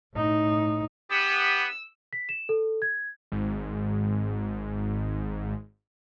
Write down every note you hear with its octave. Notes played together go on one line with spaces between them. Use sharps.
A2 D#4
B3 G4 E6
B6
E7
A4
G#6
G#1 G#2